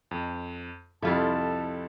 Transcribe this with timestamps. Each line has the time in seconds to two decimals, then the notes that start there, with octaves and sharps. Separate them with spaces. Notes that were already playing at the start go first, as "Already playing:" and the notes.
0.11 F2
1.03 C2 F2 E4 F4 A4 A5